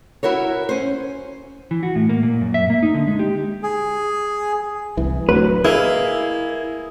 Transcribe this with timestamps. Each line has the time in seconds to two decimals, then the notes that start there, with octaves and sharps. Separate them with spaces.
0.23 E4 F#4 A#4 C#5
0.69 C#4 C5
1.71 E3
1.83 F#4
1.95 A2
2.09 A#3
2.23 A#2
2.41 F#2
2.54 E5
2.70 A#3
2.83 D#4
2.94 D3
3.07 G#3
3.19 G4
3.63 G#4
4.97 C2 E3
5.29 D1 D2 F#3 B4
5.65 A#3 E4 G#4 B4 D#5